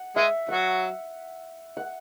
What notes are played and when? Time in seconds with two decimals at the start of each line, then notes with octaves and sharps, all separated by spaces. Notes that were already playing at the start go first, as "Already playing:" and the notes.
Already playing: F#5
0.16 G#3 G#4 E5
0.49 F#3 F#4 F#5
1.77 F#5